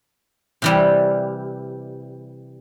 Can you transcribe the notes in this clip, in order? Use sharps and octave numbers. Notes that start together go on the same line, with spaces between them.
C3 E3 G3